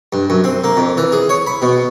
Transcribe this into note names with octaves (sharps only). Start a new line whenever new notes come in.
G2
F#2
C4
A#3
F2
E3
G#4
C#5
B5
B2